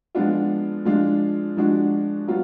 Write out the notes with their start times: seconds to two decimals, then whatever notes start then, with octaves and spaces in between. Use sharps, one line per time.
0.15 F3 G#3 B3 D4 F4
0.85 F3 G#3 D4 F4
1.57 F3 G#3 D4 F#4
2.27 F#3 B3 F4